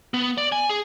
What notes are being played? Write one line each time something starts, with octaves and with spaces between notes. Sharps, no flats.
B3
D5
G#5
G#4